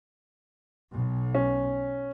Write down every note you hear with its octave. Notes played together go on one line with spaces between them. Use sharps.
B1
C#4